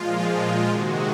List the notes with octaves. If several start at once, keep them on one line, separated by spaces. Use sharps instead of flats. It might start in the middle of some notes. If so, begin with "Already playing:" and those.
Already playing: A#2 F3 G#3 F4
F4
C3 D#3 G#3 F#4